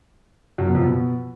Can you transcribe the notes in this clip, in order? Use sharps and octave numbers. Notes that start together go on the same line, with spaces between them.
F#2
B2
F2
B2